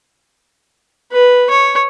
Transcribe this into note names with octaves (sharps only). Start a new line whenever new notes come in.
B4
C#5